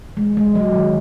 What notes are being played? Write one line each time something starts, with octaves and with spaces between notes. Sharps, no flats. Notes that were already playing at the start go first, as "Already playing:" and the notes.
G#3
G#3
F#3
D#3